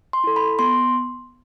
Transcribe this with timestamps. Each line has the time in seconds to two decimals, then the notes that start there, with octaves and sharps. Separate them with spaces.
0.13 C6
0.24 E4 A4
0.36 B5
0.59 B3 C6